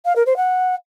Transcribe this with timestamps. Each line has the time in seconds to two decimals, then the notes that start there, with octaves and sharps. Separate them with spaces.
0.05 F5
0.16 A#4
0.26 C5
0.37 F#5